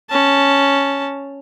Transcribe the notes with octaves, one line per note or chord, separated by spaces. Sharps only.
C#4 A5